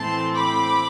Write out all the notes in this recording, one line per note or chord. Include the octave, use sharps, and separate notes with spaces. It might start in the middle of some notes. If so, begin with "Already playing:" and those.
Already playing: A2 E3 A3 C4 A5 C6
B5 D6